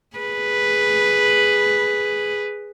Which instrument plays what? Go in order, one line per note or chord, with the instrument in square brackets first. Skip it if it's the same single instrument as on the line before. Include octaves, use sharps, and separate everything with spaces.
[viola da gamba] G#4 B4